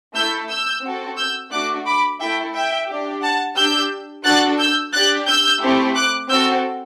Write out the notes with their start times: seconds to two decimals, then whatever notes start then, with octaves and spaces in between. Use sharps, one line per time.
0.15 A3 E4 A4 E6 G6
0.49 E6 G6
0.83 C4 F#4 A4
1.17 E6 G6
1.52 A3 D4 F#4 D6 F#6
1.86 B5 D6
2.20 A3 E4 A4 E5 G5
2.54 E5 G5
2.89 D4 G4
3.22 F#5 A5
3.56 D4 G4 E6 G6
4.25 D4 F#4 A4 F#6 A6
4.59 E6 G6
4.93 D4 G4 F#6 A6
5.28 E6 G6
5.62 A3 C4 E4 G4
5.95 D6 F#6
6.30 C4 F#4 A4 E6 G6